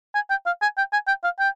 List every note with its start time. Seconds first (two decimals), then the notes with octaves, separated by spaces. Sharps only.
0.15 G#5
0.30 G5
0.46 F5
0.62 G#5
0.78 G5
0.93 G#5
1.08 G5
1.24 F5
1.39 G5